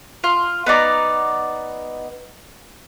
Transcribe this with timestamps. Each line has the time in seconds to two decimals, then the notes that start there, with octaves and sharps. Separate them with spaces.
0.24 F4
0.66 B3 D#4 D5 A#5